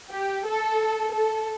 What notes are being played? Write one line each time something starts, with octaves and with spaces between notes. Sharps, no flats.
G4
A4
A4